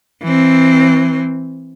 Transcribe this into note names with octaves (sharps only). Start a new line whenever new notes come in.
E3 C4